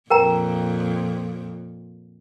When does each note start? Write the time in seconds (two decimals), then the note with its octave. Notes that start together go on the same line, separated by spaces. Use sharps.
0.10 F2 A#2 A#4 G5 A#5